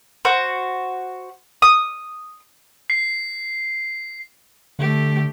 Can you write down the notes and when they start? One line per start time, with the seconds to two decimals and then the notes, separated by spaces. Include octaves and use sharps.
0.25 F#4 C5
1.62 D#6
2.90 C7
4.79 D3 A3 G4